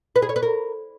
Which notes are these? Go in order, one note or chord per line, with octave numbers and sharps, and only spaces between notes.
B4
G#4
C#5
B4
A#4